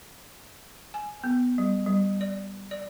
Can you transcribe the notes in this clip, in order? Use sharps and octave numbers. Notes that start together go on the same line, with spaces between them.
G#5
B3
G3
G3
D5
D5